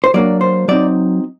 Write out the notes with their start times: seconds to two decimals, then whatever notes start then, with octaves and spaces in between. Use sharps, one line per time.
0.04 C5
0.14 F#3 A#3 D4 D5
0.41 C5
0.68 F#3 C4 D#4 D5